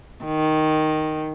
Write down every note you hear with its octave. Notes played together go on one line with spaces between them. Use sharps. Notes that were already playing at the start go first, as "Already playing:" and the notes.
D#3